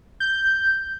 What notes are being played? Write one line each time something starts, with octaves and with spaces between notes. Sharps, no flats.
G6